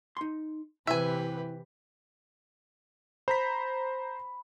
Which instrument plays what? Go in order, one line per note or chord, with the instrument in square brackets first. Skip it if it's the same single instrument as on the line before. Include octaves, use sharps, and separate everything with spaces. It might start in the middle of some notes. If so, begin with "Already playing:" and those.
[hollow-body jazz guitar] D#4 C6
[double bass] C3 E3 [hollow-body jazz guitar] E4 [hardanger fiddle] G4 B4 [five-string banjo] E5 G#5
[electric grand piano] C5 A#5 B6 [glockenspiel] B5